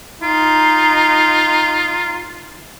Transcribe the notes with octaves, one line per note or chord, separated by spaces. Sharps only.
D#4 F4